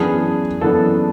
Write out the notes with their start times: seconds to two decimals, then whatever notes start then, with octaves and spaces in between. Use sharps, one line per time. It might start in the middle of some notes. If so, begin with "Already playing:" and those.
Already playing: F#2 E3 B3 D4 G#4
0.61 F#2 E3 B3 D4 A4